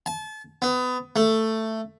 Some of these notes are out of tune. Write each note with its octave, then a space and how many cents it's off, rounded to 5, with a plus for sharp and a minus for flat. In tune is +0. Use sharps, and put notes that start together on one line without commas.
A5 -35
B3 +25
A3 +10